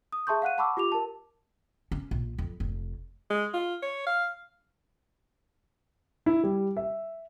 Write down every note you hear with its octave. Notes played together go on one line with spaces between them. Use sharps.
D#6
G#4 E5 A5 C6 C#6 G6
F5 F#5 F#6 D#7
F#5 A5 B5 C#6 D6 E6
F4 G4 D6 F7
A#4 A5
C#4
A#1
F2
F1
G#3
F4
C#5
F5
E4
G3
E5